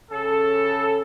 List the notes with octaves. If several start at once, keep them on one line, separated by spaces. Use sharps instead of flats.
C#3 A4